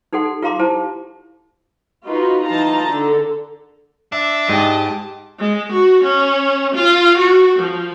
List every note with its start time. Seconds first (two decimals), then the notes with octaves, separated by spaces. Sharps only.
0.13 D#4 G4 A4 F#5 C6
0.42 F4 G4 F5 A#5 C6 D6
0.59 E4 G4 C5 A5
2.07 D#4 F4 F#4 B4
2.45 E3 D#4 F4 A5 A#5
2.87 D3 A4
4.12 D4 E5
4.49 G#2 G4 D#5 A5
5.40 G#3
5.73 F#4
6.04 C#4
6.75 F4
7.18 F#4
7.59 F3